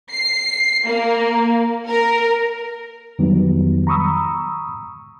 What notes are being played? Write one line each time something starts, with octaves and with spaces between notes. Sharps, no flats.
C7
A#3
A#4
F2 D#3 F#3 G3 B3
A#5 B5 C#6 D#6 E6